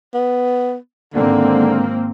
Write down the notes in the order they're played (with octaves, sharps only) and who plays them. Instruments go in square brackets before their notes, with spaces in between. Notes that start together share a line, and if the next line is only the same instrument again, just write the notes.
[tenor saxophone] B3
[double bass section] G#1 A#3 C4 [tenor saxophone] D3